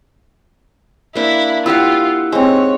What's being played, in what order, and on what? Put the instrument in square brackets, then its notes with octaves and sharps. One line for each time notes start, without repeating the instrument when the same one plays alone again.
[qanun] A#3 D4 [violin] E4
[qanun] E4 G4 F5 [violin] F4 [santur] F#5 E6
[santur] G#3 C4 [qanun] D#4 [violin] C#5